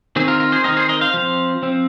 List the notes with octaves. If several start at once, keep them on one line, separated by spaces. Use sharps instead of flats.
D#3 C4 G#4
F4 A#4
F4 A#4
G#4 C5
D#3 C4 A#4 D#5
G#4 C5
A#4 D#5
C5 F5
F3 C4
F3 C4